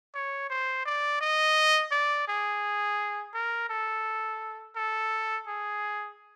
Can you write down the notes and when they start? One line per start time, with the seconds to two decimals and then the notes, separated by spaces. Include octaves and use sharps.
0.15 C#5
0.50 C5
0.85 D5
1.21 D#5
1.92 D5
2.28 G#4
3.34 A#4
3.69 A4
4.76 A4
5.47 G#4